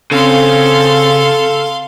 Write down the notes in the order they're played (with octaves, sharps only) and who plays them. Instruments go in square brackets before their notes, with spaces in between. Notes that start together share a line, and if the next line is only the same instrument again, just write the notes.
[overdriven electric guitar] C#3 [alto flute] C4 [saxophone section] A4 [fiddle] F5 C6